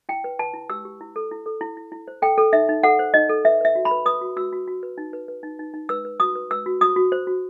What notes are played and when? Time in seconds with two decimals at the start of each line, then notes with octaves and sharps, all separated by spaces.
0.09 E4 G5
0.24 B4
0.39 B4 A5
0.54 E4
0.70 G4 E6
0.85 G4
1.01 E4
1.16 A4
1.31 E4
1.46 A4
1.61 E4
1.77 E4
1.92 E4
2.08 C5
2.22 A4 G5
2.38 A4
2.53 D#4 E5
2.69 D#4
2.83 A4 F#5
2.99 C5
3.14 D#4 D#5
3.29 A4
3.45 B4 E5
3.61 B4 E5
3.75 F#4
3.85 B5
3.91 B4
4.06 B4 D#6
4.21 F#4
4.37 F#4 E6
4.52 F#4
4.67 F#4
4.83 B4
4.98 D#4
5.13 B4
5.28 B4
5.43 D#4
5.59 D#4
5.74 D#4
5.89 B4 E6
6.05 B4
6.20 F#4 D#6
6.35 B4
6.51 B4 E6
6.66 F#4
6.81 F#4 D#6
6.96 F#4
7.12 C5
7.27 F#4